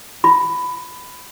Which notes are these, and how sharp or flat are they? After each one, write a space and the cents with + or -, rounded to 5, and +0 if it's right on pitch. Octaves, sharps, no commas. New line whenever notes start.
F4 +0 B5 +10